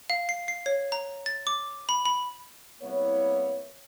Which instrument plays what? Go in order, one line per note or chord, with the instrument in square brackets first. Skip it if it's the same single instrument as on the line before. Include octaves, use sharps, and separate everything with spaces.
[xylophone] F5
C7
C7
C#5
A#5
A6
D6
B5
B5
[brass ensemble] C2 A#3 B3 E4 C#5